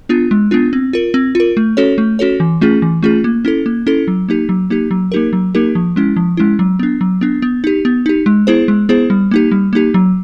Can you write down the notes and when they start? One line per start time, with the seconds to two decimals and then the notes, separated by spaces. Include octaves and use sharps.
0.09 B3 D4 F4
0.31 G#3
0.51 B3 D4 F4
0.73 C4
0.93 F4 A#4
1.14 C4
1.35 F4 A#4
1.57 A3
1.77 C#4 F#4 A4 C#5
1.98 A3
2.19 C#4 F#4 A4 C#5
2.40 E3
2.61 A3 C#4 F4 G#4
2.82 E3
3.03 A3 C#4 F4 G#4
3.24 A#3
3.45 C#4 E4 A4
3.66 A#3
3.87 C#4 E4 A4
4.08 F#3
4.29 A#3 D#4 G4
4.49 F#3
4.70 A#3 D#4 G4
4.91 F#3
5.12 A#3 D#4 G4 A#4
5.33 F#3
5.55 A#3 D#4 G4 A#4
5.75 F3
5.96 G#3 C#4 E4
6.16 F3
6.37 G#3 C#4 E4
6.59 F#3
6.79 B3 D4
7.01 F#3
7.21 B3 D4
7.42 B3
7.64 D#4 G4
7.85 B3
8.06 D#4 G4
8.26 G#3
8.47 B3 E4 G#4 C5
8.68 G#3
8.89 B3 E4 G#4 C5
9.10 G3
9.31 A#3 D#4 G4
9.52 G3
9.73 A#3 D#4 G4
9.94 F#3